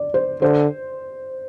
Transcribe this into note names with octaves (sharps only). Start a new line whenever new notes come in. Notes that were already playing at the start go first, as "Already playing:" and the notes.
Already playing: D5
C5
D3 C5